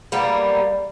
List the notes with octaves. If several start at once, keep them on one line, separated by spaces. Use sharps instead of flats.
G3 A#3 B3